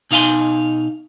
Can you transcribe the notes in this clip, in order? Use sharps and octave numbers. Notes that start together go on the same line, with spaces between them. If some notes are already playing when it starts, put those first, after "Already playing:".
B2 D#4 F5 G#5 C6